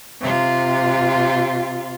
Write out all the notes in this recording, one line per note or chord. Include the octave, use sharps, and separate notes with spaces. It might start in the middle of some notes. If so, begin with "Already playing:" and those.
C3 F4